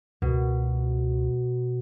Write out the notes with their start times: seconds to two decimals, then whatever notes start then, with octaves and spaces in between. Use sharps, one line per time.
0.22 C#2 B2